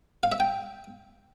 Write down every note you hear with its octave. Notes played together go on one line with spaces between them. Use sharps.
F5
E5
G5